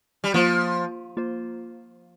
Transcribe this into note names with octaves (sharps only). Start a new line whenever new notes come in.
G3
F3 A#3 F4 C5
A#3 F4 C5